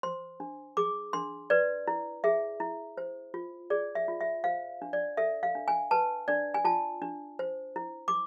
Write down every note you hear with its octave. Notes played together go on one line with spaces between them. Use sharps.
C5 C6
D4
G#4 D6
D4 C6
B4 D5
E4
G#4 E5
E4
C5
F4
G#4 D5
E5
F4
E5
C5 F5
D4
D5
A4 E5
F5
D4
G#5
B4 A5
D4 D5
G#5
F4 A5
D4
C5
E4
D6